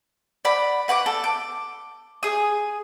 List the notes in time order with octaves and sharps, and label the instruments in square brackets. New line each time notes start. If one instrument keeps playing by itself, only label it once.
[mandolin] D5 F#5 B5
B4 F#5 C#6 D6
A4
D6
G#4 D#6